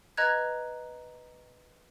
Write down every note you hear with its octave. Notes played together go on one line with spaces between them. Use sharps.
B4 D#5 A#5 F#6 G#6